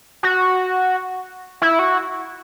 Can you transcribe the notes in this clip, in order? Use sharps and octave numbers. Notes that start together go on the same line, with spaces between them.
F#4
E4
F#4